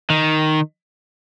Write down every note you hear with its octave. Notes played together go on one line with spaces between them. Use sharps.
D#3